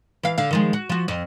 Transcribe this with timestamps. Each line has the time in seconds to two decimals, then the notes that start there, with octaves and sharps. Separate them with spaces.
0.23 E3 F5
0.38 D3 F5
0.51 D#3 F3 G#3
0.73 F#4
0.89 F3 F#4
1.08 F2